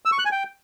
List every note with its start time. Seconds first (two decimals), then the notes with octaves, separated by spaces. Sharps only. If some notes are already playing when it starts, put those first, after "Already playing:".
0.05 E6
0.12 C#6
0.19 F#6
0.25 G#5
0.32 G5